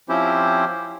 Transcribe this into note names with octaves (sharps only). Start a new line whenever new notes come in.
F3 C4 C#4 E4 G4 C5